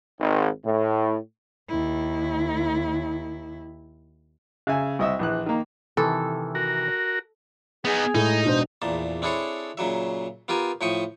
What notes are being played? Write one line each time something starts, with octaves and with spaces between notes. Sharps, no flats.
G#1
A2
D#2 E4
C#3 E5 G#5
C2 D#5 E5 E6
A#1 E3 F#6
D#3 A#3
C3 D#3 E3 A4
F#4 A#4
B3 D#4 G#4
A2 G#3 D#4
E1 D4 C5
A#1 E2 A#2 A5
C4 D4 E4 G#4 A4 C#5
A#2 C#3 F#3 E5
B3 F4 G4 A#4 G#5
A2 F3 G5 C#6 D#6